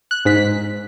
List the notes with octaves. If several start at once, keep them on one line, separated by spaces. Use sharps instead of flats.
F#6
G#2 B6